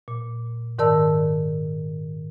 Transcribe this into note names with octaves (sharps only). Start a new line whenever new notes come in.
A#2
G#2 D#3 A#4 D5 A5 E6